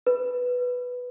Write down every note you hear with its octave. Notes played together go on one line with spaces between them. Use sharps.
B4